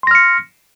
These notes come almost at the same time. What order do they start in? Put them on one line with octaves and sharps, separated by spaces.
C6 A#6 F6 C#7